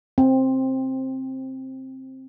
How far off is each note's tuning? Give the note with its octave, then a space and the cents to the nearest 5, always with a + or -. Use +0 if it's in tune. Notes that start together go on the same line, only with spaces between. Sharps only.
C4 +10